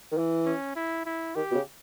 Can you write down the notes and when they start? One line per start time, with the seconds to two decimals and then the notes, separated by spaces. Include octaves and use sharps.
0.12 D#3
0.17 E3
0.46 C#4
0.76 E4
1.06 E4
1.35 D#3 G4
1.51 B2
1.55 C#3